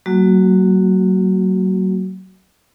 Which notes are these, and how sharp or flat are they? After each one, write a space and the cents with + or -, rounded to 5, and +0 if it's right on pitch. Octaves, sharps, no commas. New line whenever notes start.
F#3 +25 A#3 -25 F#4 +0